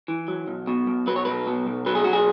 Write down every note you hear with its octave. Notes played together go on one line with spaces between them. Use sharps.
E3
F#3
B1
B2
B1
F#3 B4
C#5
B1 B4
B2
B1
F#3 B4
G#4
B1 F#4
G#4